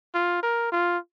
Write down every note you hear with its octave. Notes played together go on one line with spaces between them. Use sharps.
F4
A#4
F4